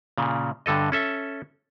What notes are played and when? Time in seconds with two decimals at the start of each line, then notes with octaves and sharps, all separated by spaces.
0.18 A#2 C#3
0.66 G2 D3 A4 D#5
0.92 C#4 A4 E5